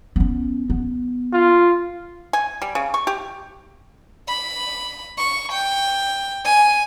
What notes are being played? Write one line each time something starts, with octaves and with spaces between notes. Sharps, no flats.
B3 C#4
B3
F4
G#5
G3
C#3
C#6
G4
B5
C#6
G5
G#5